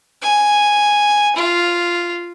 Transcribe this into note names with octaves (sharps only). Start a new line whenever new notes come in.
G#5
F4